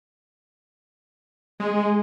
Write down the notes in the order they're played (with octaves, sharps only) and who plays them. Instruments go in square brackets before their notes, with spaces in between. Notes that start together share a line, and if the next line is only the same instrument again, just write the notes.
[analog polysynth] G#3 [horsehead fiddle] G#4